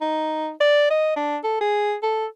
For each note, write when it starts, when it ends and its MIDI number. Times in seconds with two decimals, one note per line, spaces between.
0.01 0.50 63
0.60 0.89 74
0.91 1.14 75
1.16 1.37 62
1.44 1.58 69
1.61 1.95 68
2.03 2.26 69